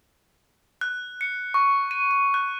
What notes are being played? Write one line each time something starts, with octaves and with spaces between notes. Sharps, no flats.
F#6
C#7
C#6
D#7
D#7
F#6